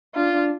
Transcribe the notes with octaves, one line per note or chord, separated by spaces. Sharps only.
D4 F4
D4